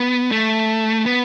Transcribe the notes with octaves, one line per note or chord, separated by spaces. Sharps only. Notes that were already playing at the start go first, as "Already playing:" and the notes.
Already playing: B3
A3
B3